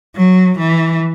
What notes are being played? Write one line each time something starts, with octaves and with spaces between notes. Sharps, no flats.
F#3
E3